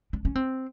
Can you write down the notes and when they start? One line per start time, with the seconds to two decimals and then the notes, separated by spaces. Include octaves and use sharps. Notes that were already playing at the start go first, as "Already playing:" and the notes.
0.13 D4
0.25 C#4
0.35 C4